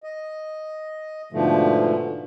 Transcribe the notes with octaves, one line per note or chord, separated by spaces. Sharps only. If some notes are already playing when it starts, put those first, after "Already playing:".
D#5
G#2 B2 D3 F3 A3